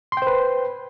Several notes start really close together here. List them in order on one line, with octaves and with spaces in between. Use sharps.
C6 G5 C5 B4